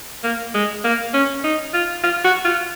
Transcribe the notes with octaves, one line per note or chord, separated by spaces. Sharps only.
A#3
G#3
A#3
C#4
D#4
F4
F4
F#4
F4